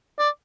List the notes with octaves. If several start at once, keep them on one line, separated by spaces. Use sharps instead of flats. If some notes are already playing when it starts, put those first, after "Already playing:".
D5